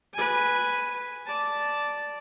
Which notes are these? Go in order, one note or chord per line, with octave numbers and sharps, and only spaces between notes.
B4 G#5
D5 A5